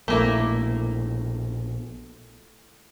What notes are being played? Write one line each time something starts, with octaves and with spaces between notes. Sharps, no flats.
A#1 B2 A3 A#3 E4